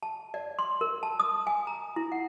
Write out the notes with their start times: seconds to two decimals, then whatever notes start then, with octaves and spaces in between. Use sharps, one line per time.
0.03 A5
0.34 D5
0.59 C6
0.81 A#4
1.03 A5
1.20 D#6
1.47 G#5
1.67 A#5
1.96 E4
2.12 F#5